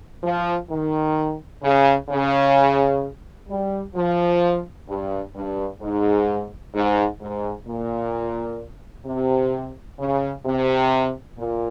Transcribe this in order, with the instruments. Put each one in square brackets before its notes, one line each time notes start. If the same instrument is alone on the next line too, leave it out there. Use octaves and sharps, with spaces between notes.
[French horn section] F3
D#3
C#3
C#3
G3
F3
G2
G2
G#2
G#2
G#2
A#2
C3
C#3
C3
A#2